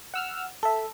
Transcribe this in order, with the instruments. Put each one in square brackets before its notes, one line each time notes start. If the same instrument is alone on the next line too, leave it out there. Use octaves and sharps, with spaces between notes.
[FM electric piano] F#5 E6 F6
[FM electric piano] A4 E5 [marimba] A5